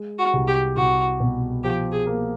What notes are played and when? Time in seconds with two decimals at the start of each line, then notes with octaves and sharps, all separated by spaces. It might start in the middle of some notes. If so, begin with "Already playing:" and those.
Already playing: G#3
0.19 F#4
0.34 C2
0.48 G4
0.77 C2 F#4
1.20 B2
1.64 F3 G4
1.92 G#4
2.07 A#3